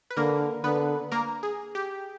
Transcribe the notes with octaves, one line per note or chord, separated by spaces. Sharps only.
B4
D3 A#3 A#4
D3 B3 B4
A#3 A#4
G#4
G4